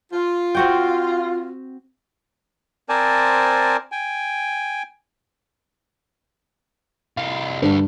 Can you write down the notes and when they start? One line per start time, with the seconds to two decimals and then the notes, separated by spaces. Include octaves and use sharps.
0.12 F4
0.55 C4 F#4 G5
2.89 C4 A#4 C5 D5 G#5 A5
3.92 G5 G#5
7.17 C2 F5
7.62 D2 G2 C6